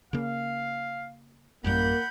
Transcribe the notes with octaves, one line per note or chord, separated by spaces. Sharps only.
C#3 A#3 F5
A1 F#2 G3 A#3 F#5 B5 G6